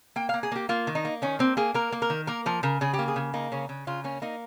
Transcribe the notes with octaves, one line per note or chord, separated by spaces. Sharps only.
A#3 G5
F5
A#3
G#4
A#3 G4
A#3 F4
D#3
D#4
A#3
D#3 C#4
A#3 C4
A#3 G#4
A#3 A#4
A#3
A#4
D#3
A#3 A#4
F3 A#4
C#3 A#4
C#3 G#4
G4
A#3
G#4
C#3
A#3 D#4
C#3 C#4
C#3
C#3 F4
A#3 C#4
A#3 D#4